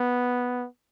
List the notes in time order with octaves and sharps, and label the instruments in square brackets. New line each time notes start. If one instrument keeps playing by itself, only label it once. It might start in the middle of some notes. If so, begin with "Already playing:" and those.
Already playing: [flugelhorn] B3